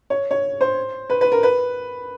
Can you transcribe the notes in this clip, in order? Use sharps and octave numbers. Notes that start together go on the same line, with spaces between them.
C#5
C#5
C5
B4
B4
A#4
B4